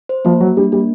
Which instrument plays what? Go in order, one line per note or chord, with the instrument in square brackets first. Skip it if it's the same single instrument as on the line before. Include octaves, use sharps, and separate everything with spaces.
[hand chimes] C5
[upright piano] F3 [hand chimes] A#3
[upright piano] F#3 [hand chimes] A#3
[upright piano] G3 [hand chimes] D4
[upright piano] G3 [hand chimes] A#3